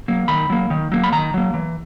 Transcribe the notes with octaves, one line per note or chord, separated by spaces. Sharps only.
F#3 A#3
D#3 B5
F#3 A#3
D#3
F#3 A#3
B5
D#3 A#5
F#3 A#3
E3